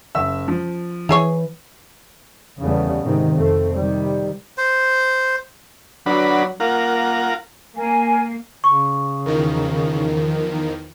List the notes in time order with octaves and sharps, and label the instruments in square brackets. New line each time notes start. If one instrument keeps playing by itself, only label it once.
[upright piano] F#1 E5 E6
F3
[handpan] E3 [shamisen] E4 G#4 C#5
[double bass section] E2 C#3 G3 A3 B3
G#2 C3 D#3
F2 A3 C4
C3 D#3 G3
[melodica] C5
[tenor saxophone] F#3 [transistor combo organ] D4 F#4 B4
[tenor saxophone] A#3 [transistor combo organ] F4 A#4 F#5
[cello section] A#3 [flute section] A#4 G#5
[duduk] C#3 [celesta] C#6
[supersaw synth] E2 D#3 F3 [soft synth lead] A#4